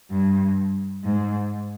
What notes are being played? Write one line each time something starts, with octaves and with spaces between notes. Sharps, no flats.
G2
G#2